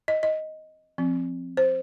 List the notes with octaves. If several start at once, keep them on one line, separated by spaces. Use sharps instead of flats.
D#5
D#5
F3 C4
C5